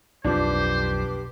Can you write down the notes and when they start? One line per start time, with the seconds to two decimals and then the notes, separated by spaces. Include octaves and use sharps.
0.25 B1 F2 F3 D4 G4 B4 C5 D6